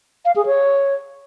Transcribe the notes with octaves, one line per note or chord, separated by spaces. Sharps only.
F5
G#4
C#5